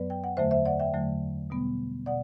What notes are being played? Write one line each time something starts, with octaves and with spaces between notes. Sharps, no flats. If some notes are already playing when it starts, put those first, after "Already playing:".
Already playing: F#2 F#3 B3 B4 D5
G5
F#5
E2 D3 F#3 A3 C5 E5
C5 E5
D5 F#5
E5 G5
E2 D3 F#3 A3
B2 G3 B3
B2 D5 F#5